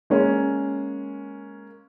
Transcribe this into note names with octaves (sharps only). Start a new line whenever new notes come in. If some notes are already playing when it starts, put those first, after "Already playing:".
G#3 A#3 C#4